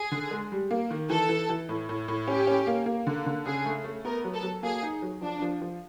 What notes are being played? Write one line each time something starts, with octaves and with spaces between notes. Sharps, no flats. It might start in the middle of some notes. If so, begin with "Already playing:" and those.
Already playing: G#4
D3
G#3
G3
A#3
D#3
E3 A4
E3
E3
A2
A2
A2
C#4 G4
C#4
A#3
A#3
D3
D3
C#3 G#4
A3
A3
B3 A#4
F#3
A4
F#3
A#3 G#4
D#4
F#3
F3 D4
F3
F3